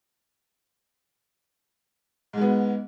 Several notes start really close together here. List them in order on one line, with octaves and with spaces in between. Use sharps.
G#2 G#3 B3